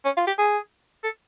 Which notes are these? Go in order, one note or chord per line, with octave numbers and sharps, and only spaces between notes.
C#4
F4
G4
G#4
A4